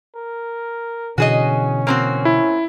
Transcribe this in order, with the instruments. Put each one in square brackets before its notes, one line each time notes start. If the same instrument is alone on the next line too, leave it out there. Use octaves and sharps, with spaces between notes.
[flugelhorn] A#4
[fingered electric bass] B2 D3 E3 [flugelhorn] C#4 [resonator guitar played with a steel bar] F#4 G#4 D#5
[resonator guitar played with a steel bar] A#3 C4 F#4
[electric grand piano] E4